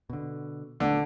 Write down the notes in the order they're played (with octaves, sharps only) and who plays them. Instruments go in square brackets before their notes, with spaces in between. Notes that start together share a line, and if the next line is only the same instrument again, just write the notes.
[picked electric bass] B2 D3
[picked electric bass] D#1 A3 B3 [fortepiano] D3